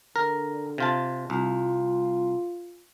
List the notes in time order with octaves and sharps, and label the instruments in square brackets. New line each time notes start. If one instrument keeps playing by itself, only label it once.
[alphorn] D3 [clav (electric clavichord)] A#4
[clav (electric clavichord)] C3 F4 A5
[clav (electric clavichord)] C2 [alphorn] F4